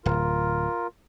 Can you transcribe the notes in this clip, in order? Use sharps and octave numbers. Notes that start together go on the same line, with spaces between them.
D1 F4 A#4